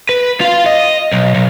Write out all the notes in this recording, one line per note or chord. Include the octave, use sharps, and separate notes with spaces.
B4
F4 F5
D#5
B1
B1